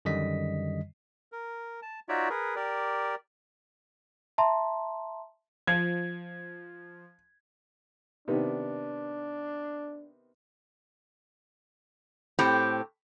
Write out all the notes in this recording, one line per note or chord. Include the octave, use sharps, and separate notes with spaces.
F#2 D3 D#3 G3 D#5 B6
A#4
A5
D#4 F4 F#4 C#5 D5 E5
G#4 A#4 B4
G4 A#4 D5
E5 A5 A#5 C6
F3 G#6
C3 D#3 B3 D4
A2 C4 G4